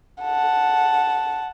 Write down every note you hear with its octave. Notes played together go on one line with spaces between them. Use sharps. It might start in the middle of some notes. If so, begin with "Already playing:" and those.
F#5 A5